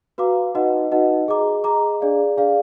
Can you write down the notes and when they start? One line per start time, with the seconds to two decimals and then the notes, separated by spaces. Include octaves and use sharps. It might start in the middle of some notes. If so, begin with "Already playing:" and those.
0.18 F#4 B4 F5 A#5 D6
0.55 D#4 F#4 B4 D#5 F#5
0.91 D#4 F#4 B4 D#5 F#5
1.28 G#4 D#5 A#5 D6
1.64 G#4 D#5 A#5 D6
2.01 D4 G#4 D5 F5
2.37 D4 G#4 D5 F5